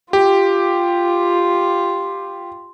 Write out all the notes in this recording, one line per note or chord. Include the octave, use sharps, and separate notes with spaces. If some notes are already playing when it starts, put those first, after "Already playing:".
F4 G4